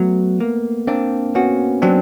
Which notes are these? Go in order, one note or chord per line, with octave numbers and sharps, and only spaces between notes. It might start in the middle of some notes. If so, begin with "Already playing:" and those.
Already playing: F#3 A3 B3
A#3
A#3 C4 D4
B3 C#4 F#4
F#3 C4 D4